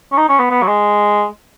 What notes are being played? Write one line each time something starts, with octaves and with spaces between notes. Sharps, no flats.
C#4
D#4
C#4
B3
B3
F#3
G#3